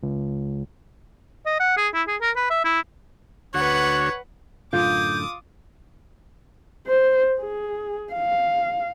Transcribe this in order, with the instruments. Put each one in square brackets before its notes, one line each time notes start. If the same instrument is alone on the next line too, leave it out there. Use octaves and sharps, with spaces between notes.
[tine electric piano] C#2
[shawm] D#5
F#5
G#4
E4
G#4
A#4
B4
E5
E4
[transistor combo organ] D2 F#4 [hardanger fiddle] B4 F#5 [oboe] C#5
[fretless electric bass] F#2 A2 D3 [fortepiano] F4 [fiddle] D6 D#6 [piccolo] G6
[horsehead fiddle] C5
G#4
F5